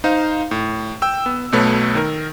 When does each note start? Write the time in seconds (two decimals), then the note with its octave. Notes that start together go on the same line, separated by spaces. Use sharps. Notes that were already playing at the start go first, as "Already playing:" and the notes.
0.04 D#4 C5 F5
0.51 A2
1.02 G5 E6 E7
1.26 B3
1.52 B1 B2 A3 B4 C#5
1.95 D#3 A#4